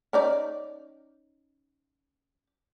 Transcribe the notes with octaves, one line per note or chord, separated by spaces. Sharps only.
C#4 D#4 D5